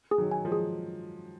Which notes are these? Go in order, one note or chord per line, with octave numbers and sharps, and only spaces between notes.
G#4
D#3 F#3
G#5
F3 G#3
G#4